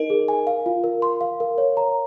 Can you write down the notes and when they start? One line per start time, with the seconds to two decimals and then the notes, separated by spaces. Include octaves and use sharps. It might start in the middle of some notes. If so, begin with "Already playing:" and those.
Already playing: D#4 A#4 D#5
0.10 G#4
0.28 G#5
0.47 F5
0.66 F4
0.84 A#4
1.02 C6
1.21 F5
1.40 A#4
1.58 C#5
1.77 A#5